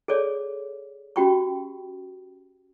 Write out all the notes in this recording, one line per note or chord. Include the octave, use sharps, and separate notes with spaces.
G#4 A4 C#5 D5
C#4 F#4 G4 G5 B5 C#6